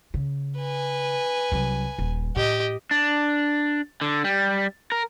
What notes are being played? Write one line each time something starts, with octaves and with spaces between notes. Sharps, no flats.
C#3
B4 G#5
C2 F#3
D#1
A2 G4 D#5
D4
D3
G3
A#4